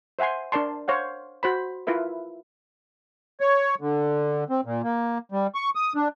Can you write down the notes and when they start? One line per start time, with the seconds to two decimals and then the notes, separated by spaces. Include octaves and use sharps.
0.19 C5 E5 F#5 G#5 C6
0.52 D4 A#4 D5 A5 C6
0.88 C5 C#5 F5 F#5
1.43 F#4 C5 B5
1.87 E4 F4 A#4 B4 E5
3.40 C#5
3.81 D3
4.50 C4
4.65 A#2
4.84 A#3
5.32 G3
5.55 C#6
5.75 D#6
5.95 D4